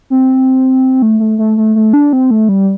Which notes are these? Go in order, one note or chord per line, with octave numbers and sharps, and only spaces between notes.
C4
A3
A3
A3
A3
A3
D4
C4
A3
G3